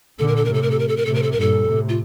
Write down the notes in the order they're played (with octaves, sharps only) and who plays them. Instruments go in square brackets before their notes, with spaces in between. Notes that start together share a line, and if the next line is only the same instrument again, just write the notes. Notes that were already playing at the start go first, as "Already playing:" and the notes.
[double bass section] A#2 D3 [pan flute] A4
[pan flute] A#4
A4
A#4
[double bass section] A2 C3 [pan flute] A4
[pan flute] A#4
A4
A#4
A4
A#4
[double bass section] A2 C3 [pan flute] A4
[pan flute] A#4
A4
A#4
[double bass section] G2 A#2 [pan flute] A4
[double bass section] A2 C3
[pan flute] F4